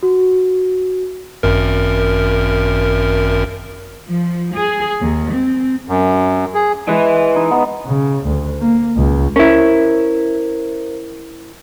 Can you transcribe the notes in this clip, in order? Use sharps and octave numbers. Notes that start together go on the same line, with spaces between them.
F#4
G#1 F#2 A#4
F3
G#4
D#2
C4
F#2
G#4
G#3 E4 B4 E5
D#4
B3
C#3
D2
A#3
C#2
C#4 E4 A#4 C5